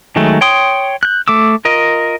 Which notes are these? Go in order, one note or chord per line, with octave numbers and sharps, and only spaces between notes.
D#3 F#3 G#3 A3
C#5 G5 C6 D#6
F#6 G6
A3 D6 E6
F4 A#4 D#5